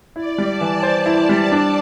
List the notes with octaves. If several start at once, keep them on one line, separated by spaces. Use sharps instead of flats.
E4 D5
G3
A5
E3
C5
E4
G3
D4